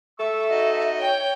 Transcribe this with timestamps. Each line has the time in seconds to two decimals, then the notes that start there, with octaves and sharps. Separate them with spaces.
0.19 A4 E5 C#6 E6
0.50 D#4 F#4 D#5
1.00 C#5 G5